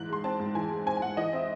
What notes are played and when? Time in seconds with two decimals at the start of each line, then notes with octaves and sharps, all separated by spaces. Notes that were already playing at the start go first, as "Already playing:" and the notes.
Already playing: G#2 E3 F#6
0.09 G#3 C6
0.24 C4 A5
0.39 G#2
0.55 E3 G#5
0.71 G#3
0.86 C4 G#5
0.97 G#5
1.02 G#2 F#5
1.17 E3 D#5
1.33 C4 E5